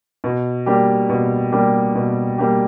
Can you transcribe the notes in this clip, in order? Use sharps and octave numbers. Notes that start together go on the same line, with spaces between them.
B2
G3 A#3 D4 G4
B2
G3 A#3 D4 G4
B2
G3 A#3 D4 G4